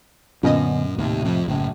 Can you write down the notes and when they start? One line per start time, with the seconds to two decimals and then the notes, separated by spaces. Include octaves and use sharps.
0.43 F#2 A#2 D3 B3 C#4 D#5
0.98 D#2 A2 C3
1.25 F2
1.48 F#1 F#2 A2